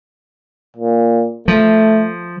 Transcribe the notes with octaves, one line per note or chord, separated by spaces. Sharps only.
A#2
F3 A3